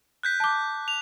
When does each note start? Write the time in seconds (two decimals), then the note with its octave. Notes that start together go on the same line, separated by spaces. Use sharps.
0.23 F#6 G6 B6
0.40 A5 D6
0.88 F7